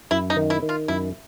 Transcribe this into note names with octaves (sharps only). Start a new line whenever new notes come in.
F#2 E4
D#4
D#3
E4
D#3
F4
F#2 E4